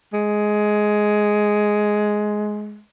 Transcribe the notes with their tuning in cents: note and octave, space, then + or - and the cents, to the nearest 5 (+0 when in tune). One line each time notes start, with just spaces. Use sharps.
G#3 +10